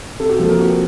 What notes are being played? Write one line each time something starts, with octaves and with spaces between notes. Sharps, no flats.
C3 A4
F#4
F3 A#3 A4
A#4
C3 F#4